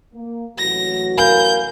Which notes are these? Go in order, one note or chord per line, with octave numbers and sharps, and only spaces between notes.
A#3
A1 F#3 F#4 A#6
A#4 F5 G#5 B5 G6